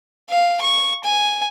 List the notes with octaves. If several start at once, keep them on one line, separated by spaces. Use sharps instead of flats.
F5
C#6
G#5